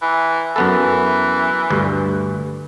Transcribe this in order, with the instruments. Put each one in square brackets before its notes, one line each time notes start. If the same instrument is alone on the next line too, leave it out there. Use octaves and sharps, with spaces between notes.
[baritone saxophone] E3
[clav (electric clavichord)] F#2 B3 A4 [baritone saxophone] E3
[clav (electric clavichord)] D2 G2